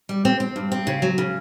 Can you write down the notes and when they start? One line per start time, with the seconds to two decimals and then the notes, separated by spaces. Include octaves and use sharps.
0.09 G3
0.25 C4
0.40 C4
0.56 G2
0.72 C4
0.87 C#3
1.02 F#3
1.18 C#3